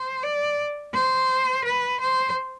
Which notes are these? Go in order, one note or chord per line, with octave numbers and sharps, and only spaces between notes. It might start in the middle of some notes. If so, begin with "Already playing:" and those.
Already playing: C5
D5
C5
B4
C5